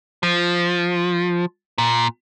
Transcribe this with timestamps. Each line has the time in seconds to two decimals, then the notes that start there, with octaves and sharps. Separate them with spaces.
0.23 F3
1.78 A#2